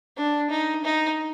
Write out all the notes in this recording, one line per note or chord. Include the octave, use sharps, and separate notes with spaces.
D4
D#4
D#4